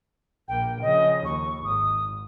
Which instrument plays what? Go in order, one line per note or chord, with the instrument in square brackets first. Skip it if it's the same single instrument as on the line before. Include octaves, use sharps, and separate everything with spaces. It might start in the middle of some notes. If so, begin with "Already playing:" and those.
[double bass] A#1 A#3 [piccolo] G5
[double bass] C#3 F3 [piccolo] D#5
[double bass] D#2 [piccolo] C#6
[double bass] G#1 [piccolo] D#6